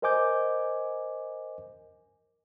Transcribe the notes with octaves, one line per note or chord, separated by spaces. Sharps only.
A#4 C5 D#5 G#5 D6 G6